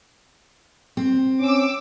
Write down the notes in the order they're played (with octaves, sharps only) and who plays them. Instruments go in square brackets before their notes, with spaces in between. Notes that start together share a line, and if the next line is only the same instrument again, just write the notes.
[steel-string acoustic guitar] C4
[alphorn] C#4 [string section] D6 E6